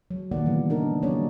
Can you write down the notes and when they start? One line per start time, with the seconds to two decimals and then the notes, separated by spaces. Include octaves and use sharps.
0.10 F#3
0.31 A#2 D#3 G3 A#3 D5 F#5
0.45 C#3 E3 F#3 B3
0.70 D4 D#4 A#4
1.02 F#3 G3 A#3 C#4 C#5 D5